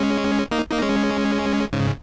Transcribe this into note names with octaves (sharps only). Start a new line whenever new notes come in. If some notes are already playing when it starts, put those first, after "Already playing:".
Already playing: G#3 C#4
A#3 D#4
A#3 D#4
G#3 C#4
G#2 C#3